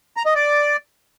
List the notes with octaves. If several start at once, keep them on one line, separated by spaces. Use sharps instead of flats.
A#5
D#5
D5